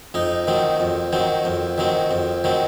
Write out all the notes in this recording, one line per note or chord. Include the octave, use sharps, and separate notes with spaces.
F2 D#4
D#3 F#3 C4
F2
D#3 F#3 C4
F2
D#3 F#3 C4
F2
D#3 F#3 C4